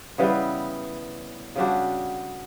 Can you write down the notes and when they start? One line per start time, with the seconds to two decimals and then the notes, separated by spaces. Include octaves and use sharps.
0.18 C#3 E3 G3 B3
1.56 C#3 G3 D4 F#4